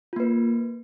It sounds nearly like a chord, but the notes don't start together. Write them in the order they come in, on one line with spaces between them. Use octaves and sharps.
F4 A#3 B4